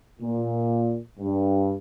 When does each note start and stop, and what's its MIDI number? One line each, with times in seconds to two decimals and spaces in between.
0.21 0.96 46
1.20 1.75 43